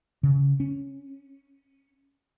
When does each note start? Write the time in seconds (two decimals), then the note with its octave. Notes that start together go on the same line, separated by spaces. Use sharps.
0.23 C#3
0.60 C#4